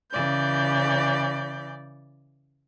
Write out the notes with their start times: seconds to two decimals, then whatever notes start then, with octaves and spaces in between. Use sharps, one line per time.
0.12 C#3 E3 D5 G6